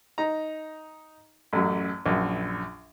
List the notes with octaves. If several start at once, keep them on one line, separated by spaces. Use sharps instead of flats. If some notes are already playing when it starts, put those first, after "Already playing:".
D#4 A#5
A1 F#2
A#1 F#2